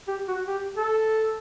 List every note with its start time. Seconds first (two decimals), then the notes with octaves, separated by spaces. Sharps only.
0.08 G4
0.28 F#4
0.48 G4
0.77 A4